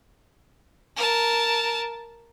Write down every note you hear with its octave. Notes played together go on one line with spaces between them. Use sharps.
A#4 A5